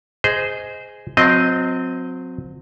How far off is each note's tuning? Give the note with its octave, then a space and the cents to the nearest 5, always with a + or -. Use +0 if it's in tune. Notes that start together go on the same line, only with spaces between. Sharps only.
G#4 +0 C5 -20 D#5 +0
F#3 -35 C4 -15 D#5 +0